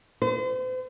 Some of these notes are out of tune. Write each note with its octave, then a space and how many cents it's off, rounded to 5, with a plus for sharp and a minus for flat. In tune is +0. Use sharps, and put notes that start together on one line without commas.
C5 -40